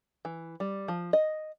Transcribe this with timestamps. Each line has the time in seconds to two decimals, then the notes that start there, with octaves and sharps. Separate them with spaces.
0.25 E3
0.60 G3
0.88 F3
1.13 D#5